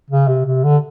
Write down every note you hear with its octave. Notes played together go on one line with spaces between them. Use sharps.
C#3
C3
C3
D3